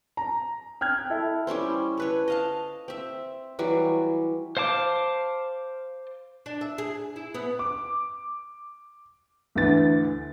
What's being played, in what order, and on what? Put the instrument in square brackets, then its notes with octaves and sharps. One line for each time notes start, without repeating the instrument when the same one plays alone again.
[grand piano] A#5
G5 F6 F#6 G#6
E4 A4
[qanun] G3 C#4 E4 C5
A4 B4 C#5
D#5 F5 A5
C4 E5
E3 F#3 G3
[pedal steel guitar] C5 F5 A5 D6
[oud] D4
E5
G#4
E4
B3
[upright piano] D6
D2 D3 E3 A6